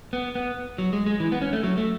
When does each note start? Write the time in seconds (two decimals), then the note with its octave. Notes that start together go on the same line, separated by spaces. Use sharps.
0.13 B3
0.35 B3
0.78 F#3
0.93 G#3
1.06 G#3
1.20 E3
1.32 B3
1.42 C#4
1.53 A3
1.63 F#3
1.78 A3